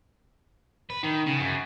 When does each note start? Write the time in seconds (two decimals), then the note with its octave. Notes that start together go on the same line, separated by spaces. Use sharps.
0.90 B4
1.03 D#3
1.26 C#3
1.40 F#2